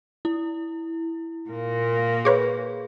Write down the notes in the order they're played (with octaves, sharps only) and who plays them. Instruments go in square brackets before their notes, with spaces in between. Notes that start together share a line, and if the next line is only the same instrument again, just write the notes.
[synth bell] E4
[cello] A#2 A#3
[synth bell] G#4 [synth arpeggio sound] B4 C#5 D6